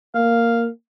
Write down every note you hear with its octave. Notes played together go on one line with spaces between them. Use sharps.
A#3 F5